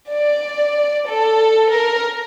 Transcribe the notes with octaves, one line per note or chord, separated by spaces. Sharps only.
D5
A4
A#4